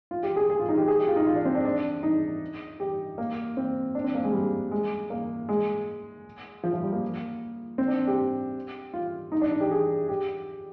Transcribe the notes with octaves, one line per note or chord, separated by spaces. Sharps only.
F4
G4
G#4
G#4
F4
D#4
G4
G#4
G4
F4
D#4
F4
D4
C4
D4
D4
D#4
G4
A#3
C4
D4
C4
A#3
G#3
G3
G#3
A#3
G#3
F3
F3
G3
A#3
C4
D4
G4
F4
D#4
D4
D#4
G4
G#4
G4